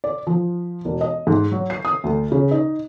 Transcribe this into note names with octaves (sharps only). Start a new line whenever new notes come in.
D5
F3
E1
D#5
G#2
F#3
C7
D#6
D2
C#3
D#4